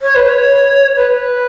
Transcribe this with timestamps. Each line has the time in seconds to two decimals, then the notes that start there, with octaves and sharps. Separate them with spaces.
0.02 C#5
0.15 B4
0.29 C#5
0.96 B4